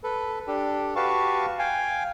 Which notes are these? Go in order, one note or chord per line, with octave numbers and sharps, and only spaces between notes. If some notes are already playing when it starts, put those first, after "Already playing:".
A4 B4
D4 G4 A4
F#4 G4 B4 F5 A5 C#6
F5 G5 G#5